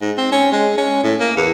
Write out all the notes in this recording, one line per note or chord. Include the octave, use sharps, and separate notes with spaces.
G#2
C4
C#4
G#3
C#4
A2
A#3
E2